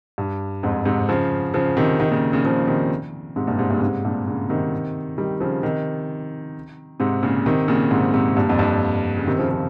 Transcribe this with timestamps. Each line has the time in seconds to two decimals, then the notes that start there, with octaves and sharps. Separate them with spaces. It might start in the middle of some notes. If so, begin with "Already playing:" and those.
0.18 G2
0.63 F2 G#2
0.86 G#2 C3
1.09 C#3 F3
1.54 C#3 F3
1.77 C3 D#3
1.99 C3 D#3
2.10 A#2 C#3
2.33 A#2 C#3
2.45 C#3 F3
2.67 C3 D#3
3.36 G#2 C3
3.47 G2 A#2
3.59 G#2 C3
3.70 G2 A#2
3.78 C#3
3.82 G#2 C3
4.05 G2 A#2
4.27 A#2 C#3
4.49 C3 D#3
5.18 D#3 G3
5.40 C#3 F3
5.63 C3 D#3
7.00 G#2 C3
7.23 A#2 C#3
7.46 C3 D#3
7.68 A#2 C#3
7.91 G#2 C3
8.14 G#2 C3
8.37 G2 A#2
8.49 F2
8.59 G2
9.17 C#3
9.27 C3 D#3
9.39 C#3 F3
9.51 C#3 F3